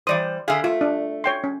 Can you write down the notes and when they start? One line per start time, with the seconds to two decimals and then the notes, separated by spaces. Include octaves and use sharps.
0.07 E3 G3 C5 D5 D#6
0.48 D3 G#4 E5 F5
0.64 A3 F4
0.81 D4
1.24 C#5 G5 C6
1.44 C#4